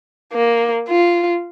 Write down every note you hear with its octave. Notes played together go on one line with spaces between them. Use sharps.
A#3
F4